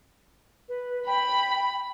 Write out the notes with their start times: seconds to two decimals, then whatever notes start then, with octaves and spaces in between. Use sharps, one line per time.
0.69 B4
1.07 G5 B5